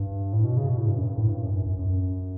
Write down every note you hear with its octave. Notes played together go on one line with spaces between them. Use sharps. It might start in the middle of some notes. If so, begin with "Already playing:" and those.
Already playing: G2
A2
B2
C#3
B2
A2
G2
F#2
G2
A2
G2
F#2
F#2
F#2
F#2